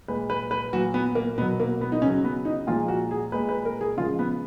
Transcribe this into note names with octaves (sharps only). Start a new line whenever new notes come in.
A#2 G#3 B4
B4
B4
A#2 F#3 F#4
B3
A#3
B2 F#3 B3
A#3
B3
D#4
C#3 F#3 C#4
B3
D#4
A#2 F3 G#3 F4
F#4
G#4
A#2 G#3 B4
B4
A#4
G#4
C#3 F3 G#3 F4
B3